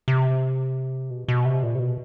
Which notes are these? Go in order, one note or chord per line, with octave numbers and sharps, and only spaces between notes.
C3
B2
B2
C3
A#2
C3
B2